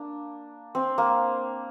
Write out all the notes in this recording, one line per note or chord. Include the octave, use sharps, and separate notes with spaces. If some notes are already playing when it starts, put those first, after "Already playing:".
Already playing: A#3 D4
C4
A#3